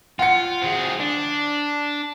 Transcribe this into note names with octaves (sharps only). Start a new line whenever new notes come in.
F4 F#5 C#7
C4 G#4
D4